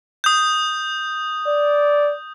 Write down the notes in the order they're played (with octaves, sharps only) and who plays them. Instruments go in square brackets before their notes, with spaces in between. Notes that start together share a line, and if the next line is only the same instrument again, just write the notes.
[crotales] D#6 G6
[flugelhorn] D5